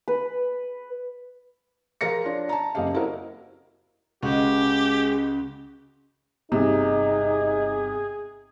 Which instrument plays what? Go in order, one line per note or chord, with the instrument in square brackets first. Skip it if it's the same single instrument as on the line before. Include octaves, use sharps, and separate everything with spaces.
[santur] B4
[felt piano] F3 G#4 A#4 F5 A#6 C#7
D4 F4 C#5
A5 A#5
F#1 F#2 A#3 G4 D#5 F5
C4 E4 F#4 A#4 D#5
[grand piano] C#2 F#4 [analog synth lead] G#3 [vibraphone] C#4 [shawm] G4
[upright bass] G1 [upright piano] C3 [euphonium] D#4 [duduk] G#4